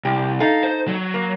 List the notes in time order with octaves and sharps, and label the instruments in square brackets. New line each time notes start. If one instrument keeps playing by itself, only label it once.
[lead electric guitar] C2 [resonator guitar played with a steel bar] G4
[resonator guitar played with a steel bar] D#4 A4 [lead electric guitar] F5
[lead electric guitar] C5
F#3
[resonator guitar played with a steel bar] A#3